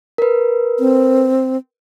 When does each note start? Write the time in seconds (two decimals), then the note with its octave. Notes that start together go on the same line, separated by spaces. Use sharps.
0.18 A#4 B4
0.79 C4